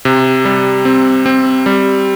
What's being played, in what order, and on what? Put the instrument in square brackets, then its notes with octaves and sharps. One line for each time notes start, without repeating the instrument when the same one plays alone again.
[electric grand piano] C3
G3
C4
C4
G3